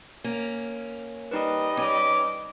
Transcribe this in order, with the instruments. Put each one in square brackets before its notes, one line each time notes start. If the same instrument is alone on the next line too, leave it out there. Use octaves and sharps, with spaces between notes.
[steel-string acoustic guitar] A#3 C#4
[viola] G3 D#5 [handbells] D#4 B4
[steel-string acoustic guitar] C#4 [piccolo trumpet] D6